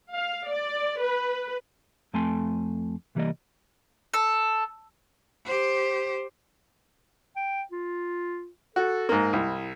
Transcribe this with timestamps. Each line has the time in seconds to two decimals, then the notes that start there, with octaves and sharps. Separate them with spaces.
0.13 F5
0.49 D5
1.01 B4
2.14 F2 A3 C4 G#5 A5 C6
3.15 C2 E3 G3 A#3 D5 D#5
4.14 A4
5.46 G4 C5
7.36 G5
7.72 F4
8.76 F#4 A4
9.09 G#2 A#3
9.33 C2 E4